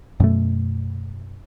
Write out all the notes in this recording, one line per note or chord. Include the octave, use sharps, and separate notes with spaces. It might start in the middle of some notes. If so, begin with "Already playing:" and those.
F#2 B2 A3